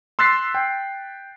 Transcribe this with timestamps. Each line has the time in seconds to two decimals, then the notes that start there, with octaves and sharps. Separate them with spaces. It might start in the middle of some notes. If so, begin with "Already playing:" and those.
0.19 C6 E6 F#6 A6 B6 C7
0.55 G5